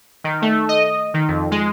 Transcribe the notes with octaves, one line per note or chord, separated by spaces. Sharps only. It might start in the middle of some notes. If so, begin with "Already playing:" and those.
D#3
A3
D#5
D#3
F2
G#3